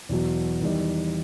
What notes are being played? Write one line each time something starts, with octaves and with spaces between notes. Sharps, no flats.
E2 B2 F#3
E2 D#3 G3 D#4